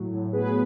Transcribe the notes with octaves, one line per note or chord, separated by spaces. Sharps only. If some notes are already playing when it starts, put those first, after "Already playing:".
Already playing: A2 F#3
A2
B3 G#4 B4